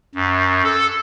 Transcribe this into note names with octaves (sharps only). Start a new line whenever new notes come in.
F#2
A4